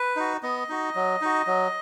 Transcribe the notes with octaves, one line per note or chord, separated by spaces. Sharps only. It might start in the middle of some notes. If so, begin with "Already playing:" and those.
Already playing: B4
D#4 F#4
B3 D#5
D#4 F#4
F#3
D#4 F#4
F#3